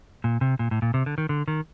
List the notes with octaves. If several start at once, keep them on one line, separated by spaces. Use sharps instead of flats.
A#2
C3
A#2
A2
A#2
C3
D3
D#3
D3
D#3